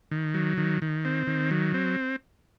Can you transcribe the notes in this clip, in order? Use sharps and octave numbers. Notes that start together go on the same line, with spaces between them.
D#3
F#3
D#3
D#3
C4
D#3
F#3
C4